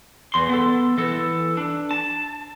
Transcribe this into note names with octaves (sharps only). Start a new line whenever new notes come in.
E2 C6
B3 A4
E3 A4
D4
A5